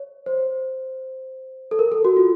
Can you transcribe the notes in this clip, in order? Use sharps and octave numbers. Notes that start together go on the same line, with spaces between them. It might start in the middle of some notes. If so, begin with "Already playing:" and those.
Already playing: C#5
C5
A4
A#4
A4
F#4
F4